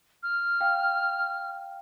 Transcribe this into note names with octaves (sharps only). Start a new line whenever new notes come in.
F6
F5 G5